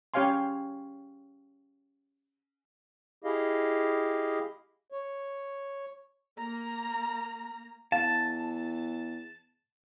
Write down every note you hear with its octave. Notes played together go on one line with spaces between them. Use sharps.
C#4 G4 C#5 F5 G#5 C6
E4 G4 G#4 D#5 F5
C#5
A#3 A#5
E2 F5 A5